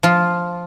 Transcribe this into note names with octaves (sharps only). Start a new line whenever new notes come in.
F3 F4